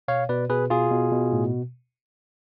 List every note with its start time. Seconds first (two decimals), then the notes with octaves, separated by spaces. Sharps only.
0.08 B2 C#5 F5
0.29 B2 B4 D5
0.49 B2 G#4 B4
0.70 B2 F4 G#4
0.91 B2
1.12 B2
1.33 A2